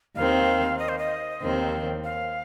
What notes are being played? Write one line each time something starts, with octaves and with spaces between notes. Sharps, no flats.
D#2 D#3 C4 F5
D#5
C5
D#5
D#2 D#3 C4
F5